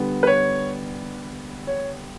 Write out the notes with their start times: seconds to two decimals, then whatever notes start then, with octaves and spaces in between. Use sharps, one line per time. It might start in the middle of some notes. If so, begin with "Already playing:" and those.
Already playing: D3 G3 B3
0.23 B4
0.27 C#5
1.67 C#5